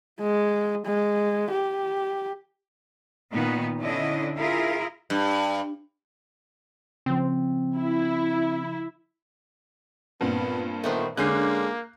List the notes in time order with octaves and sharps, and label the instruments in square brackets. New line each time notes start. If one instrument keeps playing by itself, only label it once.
[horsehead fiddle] G#3
G#3
G4
[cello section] A#2 D#3 B3
D3 C#4 D4 E4 D#5
E4 F4 G#4 A#4
[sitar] G2
[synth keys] C#3 F3 [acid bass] C4
[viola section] E4
[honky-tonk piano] G2 A#2 C4 [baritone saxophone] B3
[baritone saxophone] D#3 [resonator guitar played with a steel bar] A3 B3 C5
[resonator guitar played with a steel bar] D3 C#4 [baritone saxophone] G#3 [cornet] A#3 [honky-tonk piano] F#6 G6 C7